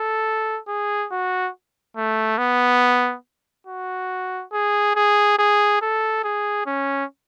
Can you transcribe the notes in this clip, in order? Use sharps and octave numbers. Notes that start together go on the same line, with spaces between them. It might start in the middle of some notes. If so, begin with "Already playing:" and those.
Already playing: A4
G#4
F#4
A3
B3
F#4
G#4
G#4
G#4
A4
G#4
C#4